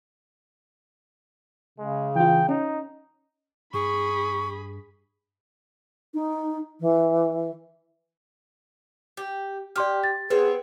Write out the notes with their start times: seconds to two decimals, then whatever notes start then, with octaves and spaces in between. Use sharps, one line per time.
1.78 C#3 G#3
2.16 E3 F4 G5
2.49 C#4 D#4
3.74 G2 G#4 B5 C#6
6.14 D#4
6.80 E3
9.17 G4
9.76 G4 D5 C6 F6
10.04 A6
10.30 B3 C4 G#4 B4 C#5